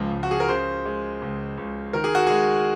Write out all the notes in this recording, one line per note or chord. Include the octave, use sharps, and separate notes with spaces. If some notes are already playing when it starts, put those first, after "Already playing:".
Already playing: C#2 C#3 F3
C#2
F#4
G#4
A#4
C#3 C5
G#3
C#2
C#2
D#3 A#4
G#4
F#4
G#3 G#4